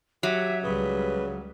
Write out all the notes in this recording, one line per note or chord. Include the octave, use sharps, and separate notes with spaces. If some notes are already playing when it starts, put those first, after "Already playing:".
F#3 G4 E5
C#2 C#3 G3 B4